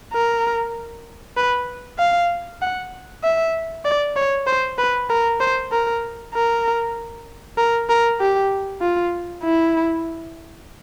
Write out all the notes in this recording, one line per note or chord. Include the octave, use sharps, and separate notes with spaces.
A#4
B4
F5
F#5
E5
D5
C#5
C5
B4
A#4
C5
A#4
A#4
A#4
A#4
G4
F4
E4